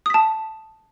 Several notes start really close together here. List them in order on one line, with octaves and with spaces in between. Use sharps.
D#6 B6 A5